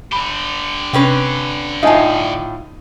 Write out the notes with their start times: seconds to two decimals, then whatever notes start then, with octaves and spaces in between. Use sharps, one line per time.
0.13 D3 G4 B5
0.93 C3 C4 C#4 B4
1.83 A2 D#4 F4 E5 G#5 A5